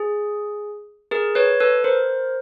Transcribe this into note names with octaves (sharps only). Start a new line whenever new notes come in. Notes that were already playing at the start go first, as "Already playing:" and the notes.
Already playing: G#4
G#4 A#4
B4 C#5
A4 B4
A#4 C5